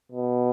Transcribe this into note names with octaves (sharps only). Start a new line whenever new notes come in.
B2